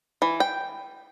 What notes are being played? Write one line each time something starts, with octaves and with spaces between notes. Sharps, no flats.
E3
G5